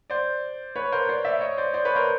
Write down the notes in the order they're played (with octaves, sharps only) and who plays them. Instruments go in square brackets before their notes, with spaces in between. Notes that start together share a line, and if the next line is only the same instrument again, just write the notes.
[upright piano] C5 D5
B4 C#5
A#4 C5
C5 D5
D5 E5
C#5 D#5
C5 D5
C5 D5
B4 C#5
A#4 C5